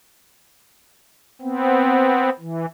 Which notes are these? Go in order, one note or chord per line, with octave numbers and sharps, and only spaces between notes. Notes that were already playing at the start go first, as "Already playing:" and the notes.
B3 C4
E3